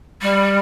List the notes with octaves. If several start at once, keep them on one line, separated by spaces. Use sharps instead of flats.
G3